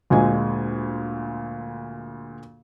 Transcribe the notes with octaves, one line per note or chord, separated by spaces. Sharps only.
D2 A#2 G#3 G#5